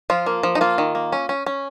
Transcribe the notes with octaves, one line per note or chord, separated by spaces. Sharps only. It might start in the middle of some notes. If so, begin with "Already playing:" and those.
F3 F4
A#3
F3
D#4
A#3 F4
D#3
A#3
C#4
C#4
C#4